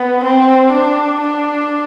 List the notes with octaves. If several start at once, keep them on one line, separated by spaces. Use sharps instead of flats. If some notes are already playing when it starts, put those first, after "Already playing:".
Already playing: B3
C4
D4
D4